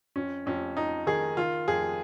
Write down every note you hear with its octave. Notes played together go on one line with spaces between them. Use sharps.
F2 C#4
F2 C#4
F2 D#4
D#3 G#4
D#3 F4
F2 G#4